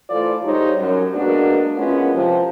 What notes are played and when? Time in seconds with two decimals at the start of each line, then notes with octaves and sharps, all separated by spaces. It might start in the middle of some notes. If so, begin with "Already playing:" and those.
0.10 E3 A3 F4 A4 C5 D5
0.43 G#2 G3 D#4 G4 C5 C#5
0.79 F#2
1.14 G#3 A#3 B3 D4 F#4
1.78 G#3 A#3 B3 C#4 E4 F4
2.14 C3 F3